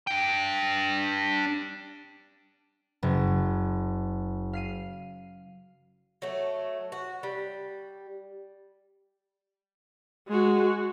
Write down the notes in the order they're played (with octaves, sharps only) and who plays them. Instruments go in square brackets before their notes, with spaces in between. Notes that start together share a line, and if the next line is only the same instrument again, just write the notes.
[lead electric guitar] D4 G5
[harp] F#1
F5 C7 D#7
[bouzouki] F#3 A3
F#4
G3
[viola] G#3 F#4